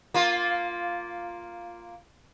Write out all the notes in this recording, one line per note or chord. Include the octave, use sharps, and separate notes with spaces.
A#3 F4